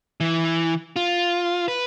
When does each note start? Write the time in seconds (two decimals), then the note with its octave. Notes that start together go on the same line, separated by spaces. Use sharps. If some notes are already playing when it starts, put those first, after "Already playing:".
0.20 E3
0.96 F4
1.68 B4